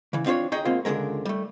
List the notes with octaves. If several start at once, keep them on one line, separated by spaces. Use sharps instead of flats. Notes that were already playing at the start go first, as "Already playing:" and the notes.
C#3 E3
C4 D4 F4 C5 C#5
D#4 G#4 C#5 D#5 G5
B2 G#3 A#3 C4 F4
C#2 A2 D3 G#3 A#4
G3 A3